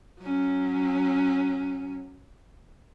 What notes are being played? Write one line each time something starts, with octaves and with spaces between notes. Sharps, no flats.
F#3 C#4